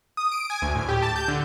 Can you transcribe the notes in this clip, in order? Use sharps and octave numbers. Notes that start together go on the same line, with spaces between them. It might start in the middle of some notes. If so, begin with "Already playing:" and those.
D#6
D7
G#5
D2
A2
G4
A5
G6
D3